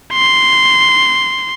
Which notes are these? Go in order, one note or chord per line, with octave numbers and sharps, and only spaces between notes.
C6